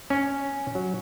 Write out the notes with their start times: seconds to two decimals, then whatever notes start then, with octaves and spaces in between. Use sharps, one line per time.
0.10 C#4
0.75 F#3